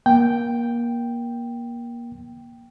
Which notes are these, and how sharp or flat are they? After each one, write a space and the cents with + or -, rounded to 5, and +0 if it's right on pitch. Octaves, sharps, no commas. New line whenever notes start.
A#3 +25 G5 +0